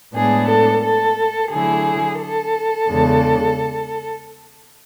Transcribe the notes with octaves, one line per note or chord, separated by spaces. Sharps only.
A2 G#3 B3 D4 G#4
A4
A4
D3 F#3 A3 E4 G#4
A4
E2 C#3 G#3 D4